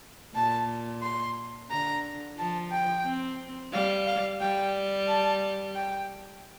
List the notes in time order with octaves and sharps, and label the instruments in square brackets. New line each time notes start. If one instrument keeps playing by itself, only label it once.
[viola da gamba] A#2 [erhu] A5
[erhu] C6
[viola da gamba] D3 [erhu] A#5
[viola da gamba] F3 [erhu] A5
[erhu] G5
[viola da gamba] C4
[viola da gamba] G3 [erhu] F5
[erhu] F5
[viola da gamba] G3 [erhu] G5
[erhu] A5
G5